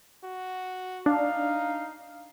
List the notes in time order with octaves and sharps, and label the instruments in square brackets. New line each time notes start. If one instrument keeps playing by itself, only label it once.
[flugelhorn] F#4
[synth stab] D4 [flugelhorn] D#4 [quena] F5